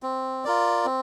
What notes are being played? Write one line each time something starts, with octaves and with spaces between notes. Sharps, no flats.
C4
F4 A#4 D5
C4